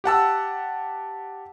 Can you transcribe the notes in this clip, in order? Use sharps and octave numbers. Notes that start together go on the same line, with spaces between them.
G4 F#5 A5 E6